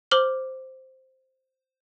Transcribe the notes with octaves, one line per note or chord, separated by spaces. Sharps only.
C5 D6 F6 F#7 G7